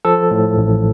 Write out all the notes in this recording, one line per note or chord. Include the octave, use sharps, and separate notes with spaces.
F3 A4
A2
A1